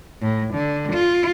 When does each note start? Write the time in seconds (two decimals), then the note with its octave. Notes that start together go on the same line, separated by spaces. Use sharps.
0.21 A2
0.54 D3
0.93 F4